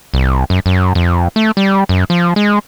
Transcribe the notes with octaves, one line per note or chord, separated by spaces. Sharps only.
C2
F#2
F#2
F2
A3
G3
F#2
F3
G#3